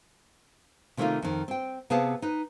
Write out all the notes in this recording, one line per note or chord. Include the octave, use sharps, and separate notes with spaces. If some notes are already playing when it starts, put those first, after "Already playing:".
C3 D#3 A3 A#3 D#4 F4
F2 D#3
C4 G5
C3 B3 G#4 F5 A5
D#4 B4